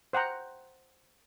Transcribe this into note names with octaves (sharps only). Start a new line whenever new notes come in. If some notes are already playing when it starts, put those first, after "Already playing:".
C5 F#5 G5 A#5